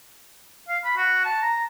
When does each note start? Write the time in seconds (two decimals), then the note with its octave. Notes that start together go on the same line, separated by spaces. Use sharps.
0.68 F5
0.84 B5
0.97 F#4
1.25 A5
1.42 A#5